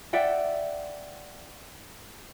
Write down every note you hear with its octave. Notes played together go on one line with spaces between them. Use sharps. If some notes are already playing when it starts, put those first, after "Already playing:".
D5 E5 F#5 G5